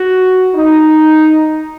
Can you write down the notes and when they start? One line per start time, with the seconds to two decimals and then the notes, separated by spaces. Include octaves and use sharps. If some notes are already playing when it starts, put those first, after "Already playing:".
Already playing: F#4
0.55 D#4